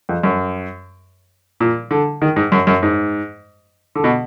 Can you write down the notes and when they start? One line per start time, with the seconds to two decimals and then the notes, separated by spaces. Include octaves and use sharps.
0.09 F2
0.23 F#2
1.60 A#2
1.91 D3
2.22 D#3
2.36 G#2
2.52 F#2
2.67 F#2
2.83 G#2
3.95 D3
4.04 B2